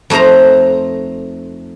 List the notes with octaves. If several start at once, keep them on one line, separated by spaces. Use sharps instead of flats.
F2 A3 D#4 C5 A#5